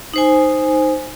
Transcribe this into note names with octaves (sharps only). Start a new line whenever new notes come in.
D#4 C5 G#5